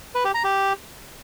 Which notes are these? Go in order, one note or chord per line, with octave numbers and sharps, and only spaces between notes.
B4
G4
A#5
G4